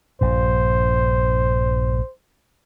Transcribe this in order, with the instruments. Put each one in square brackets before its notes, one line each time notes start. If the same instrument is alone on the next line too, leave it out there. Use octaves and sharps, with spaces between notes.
[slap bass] A#1 G2 [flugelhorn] C5